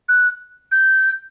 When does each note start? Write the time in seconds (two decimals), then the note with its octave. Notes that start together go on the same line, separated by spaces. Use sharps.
0.09 F#6
0.72 G6